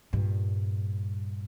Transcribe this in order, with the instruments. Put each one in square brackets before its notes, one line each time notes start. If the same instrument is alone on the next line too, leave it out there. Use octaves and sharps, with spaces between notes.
[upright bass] G2 A#2